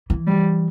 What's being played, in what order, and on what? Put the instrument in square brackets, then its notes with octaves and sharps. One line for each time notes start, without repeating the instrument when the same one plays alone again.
[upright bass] E3
[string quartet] G3